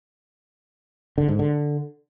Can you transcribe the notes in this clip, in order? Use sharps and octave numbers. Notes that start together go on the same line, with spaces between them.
D3
G#2
D3